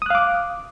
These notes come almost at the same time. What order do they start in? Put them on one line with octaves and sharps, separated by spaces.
D#6 F#6 F5 D6